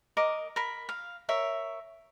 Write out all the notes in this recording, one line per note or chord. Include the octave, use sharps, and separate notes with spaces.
A#4 D#5 D6
A#4 B5
F5
A#4 C#5 E5